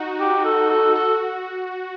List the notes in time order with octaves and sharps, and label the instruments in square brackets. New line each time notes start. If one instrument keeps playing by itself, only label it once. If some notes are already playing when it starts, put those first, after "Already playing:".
Already playing: [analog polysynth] D#4 F#4
[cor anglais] G4
A4
A4
[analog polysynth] F#4 [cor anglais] A4